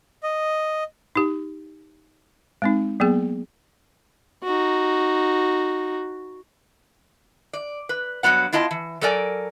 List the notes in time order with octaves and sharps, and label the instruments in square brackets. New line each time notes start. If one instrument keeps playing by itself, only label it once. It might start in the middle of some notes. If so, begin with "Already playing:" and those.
[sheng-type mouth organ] D#5
[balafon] D#4 G4
G#3 C4 D#4
F#3 A#3 B3 G#4
[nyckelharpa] D#4 F#4
[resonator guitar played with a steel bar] D5
B4
G2 E3 F#3 B3 F#5
B3 E4 F4 D#5 A5
E3
F#3 A4 A#4 D5 G#5